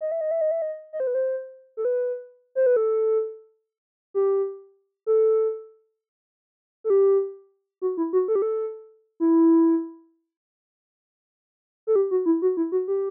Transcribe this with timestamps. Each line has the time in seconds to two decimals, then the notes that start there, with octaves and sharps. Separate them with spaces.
0.01 D#5
0.12 E5
0.21 D#5
0.31 E5
0.41 D#5
0.51 E5
0.62 D#5
0.93 D#5
1.00 C5
1.07 B4
1.14 C5
1.77 A4
1.85 B4
2.55 C5
2.66 B4
2.76 A4
4.14 G4
5.06 A4
6.84 A4
6.90 G4
7.82 F#4
7.97 E4
8.13 F#4
8.28 A4
8.35 G4
8.42 A4
9.20 E4
11.87 A4
11.96 G4
12.11 F#4
12.26 E4
12.42 F#4
12.57 E4
12.72 F#4
12.88 G4